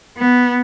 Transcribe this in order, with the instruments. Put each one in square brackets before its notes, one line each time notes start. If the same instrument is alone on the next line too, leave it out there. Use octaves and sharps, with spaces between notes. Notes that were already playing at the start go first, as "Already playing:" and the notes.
[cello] B3